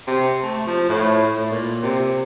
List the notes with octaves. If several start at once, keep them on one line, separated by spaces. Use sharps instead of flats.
C3
A3
F3
A2
A2
A#2
C3